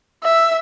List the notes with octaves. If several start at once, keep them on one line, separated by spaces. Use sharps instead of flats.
E5